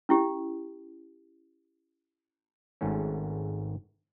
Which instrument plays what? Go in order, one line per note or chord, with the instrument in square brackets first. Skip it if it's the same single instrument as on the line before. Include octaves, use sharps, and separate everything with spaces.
[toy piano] C#4 E4 G4
[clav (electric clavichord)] G#1 G#2 A3 C#4